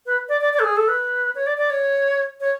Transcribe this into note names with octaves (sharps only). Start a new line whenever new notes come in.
B4
D5
D5
D5
A4
G#4
A4
B4
C#5
D5
D5
C#5
C#5